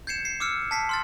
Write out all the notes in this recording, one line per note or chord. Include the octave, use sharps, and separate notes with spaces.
G6 G#6 C7 C#7 E7
C7
D6 E6 F6 C#7
A5 B6 C7
C6 F6 A6